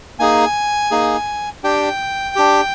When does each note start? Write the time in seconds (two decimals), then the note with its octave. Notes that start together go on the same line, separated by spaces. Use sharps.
0.19 A#3 D#4 G#4 G#5
0.91 A#3 D#4 G#4
1.64 D4 G4 G5
2.36 D4 G4